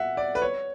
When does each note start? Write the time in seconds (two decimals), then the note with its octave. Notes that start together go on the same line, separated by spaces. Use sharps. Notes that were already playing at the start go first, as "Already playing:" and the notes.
Already playing: E5 F#5
0.17 D5
0.35 B4
0.42 C#5